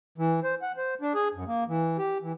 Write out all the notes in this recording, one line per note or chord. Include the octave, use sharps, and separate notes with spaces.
E3
C5
F#5
C5
D4
G#4
F#2
A#3
E3
G4
E3